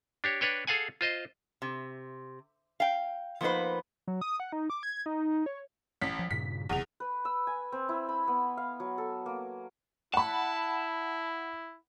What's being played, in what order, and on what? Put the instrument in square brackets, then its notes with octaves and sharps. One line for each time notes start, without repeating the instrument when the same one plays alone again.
[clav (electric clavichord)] D4 G4 C#5
D4 B4 C#5 G5
G#4 A4 F5 F#5 G#5
F4 C5 D#5
[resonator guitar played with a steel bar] C3
F5 G5
F3 A#3 B3 D#4 B4 C5
[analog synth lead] F#3
D#6
F#5
D#4
D6
G#6
D#4
C#5
[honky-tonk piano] A1 B6
[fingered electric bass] F3
[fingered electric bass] G2 A#2 C#3 [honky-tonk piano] B6
[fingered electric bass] F#1 C3 [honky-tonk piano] E2 F7
[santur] B4
E6
G#5
C4
E4
B5
B3
F5
F#3
A4
A#3
[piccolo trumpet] E4 [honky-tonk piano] F#5 B5 [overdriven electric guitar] A5